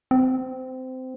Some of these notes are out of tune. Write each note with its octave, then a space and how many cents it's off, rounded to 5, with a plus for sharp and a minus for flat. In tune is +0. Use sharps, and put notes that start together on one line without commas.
C4 -20